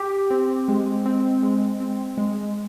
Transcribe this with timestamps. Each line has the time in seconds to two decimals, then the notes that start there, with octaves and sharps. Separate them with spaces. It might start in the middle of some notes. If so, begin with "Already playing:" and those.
Already playing: G4
0.30 C4
0.68 G#3
1.06 C4
1.43 G#3
1.80 C4
2.18 G#3